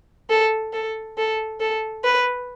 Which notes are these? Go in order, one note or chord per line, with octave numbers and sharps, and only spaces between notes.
A4
A4
A4
A4
B4